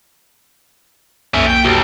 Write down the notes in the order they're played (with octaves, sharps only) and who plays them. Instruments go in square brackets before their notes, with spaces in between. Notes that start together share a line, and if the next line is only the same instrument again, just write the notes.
[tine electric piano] B1 F2 A#3 [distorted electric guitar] C#4 E5
[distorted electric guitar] G5
[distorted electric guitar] B1 [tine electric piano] F#4 G4